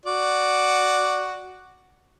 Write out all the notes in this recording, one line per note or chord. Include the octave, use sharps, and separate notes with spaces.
F#4 D5